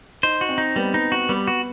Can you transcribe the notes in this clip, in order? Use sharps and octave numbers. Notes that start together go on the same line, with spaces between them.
D#4 C5
F#4
C4
D#4
G3 B3
D#4
F#4
G3 B3
F#4